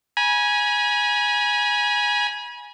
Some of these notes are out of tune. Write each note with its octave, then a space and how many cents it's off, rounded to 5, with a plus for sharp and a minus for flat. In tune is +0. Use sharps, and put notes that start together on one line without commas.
G#5 +0 B5 -40